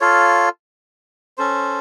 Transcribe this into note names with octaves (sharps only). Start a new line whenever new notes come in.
F4 A4 C#5 F5
C#4 A4 C5